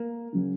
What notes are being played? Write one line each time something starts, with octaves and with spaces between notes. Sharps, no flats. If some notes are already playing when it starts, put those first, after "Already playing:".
Already playing: A#3
C#3 F#3 C#4